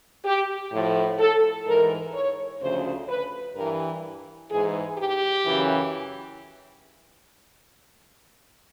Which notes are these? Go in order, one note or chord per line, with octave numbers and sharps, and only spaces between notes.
G4
A2 F3
A4
G#2 E3 A#4
C#5
D2 C#3 F3 C5
B4
G2 E3 A#4
G#2 E3 G#4
G4
F#2 C#3 E3